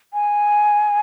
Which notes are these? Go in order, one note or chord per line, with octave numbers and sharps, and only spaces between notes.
G#5